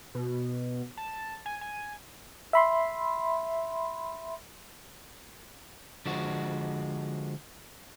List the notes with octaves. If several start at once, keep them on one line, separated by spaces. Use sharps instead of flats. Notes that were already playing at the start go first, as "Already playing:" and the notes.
B2
A5
G#5
G#5
E5 B5 C6
D3 F3 G#3 F#4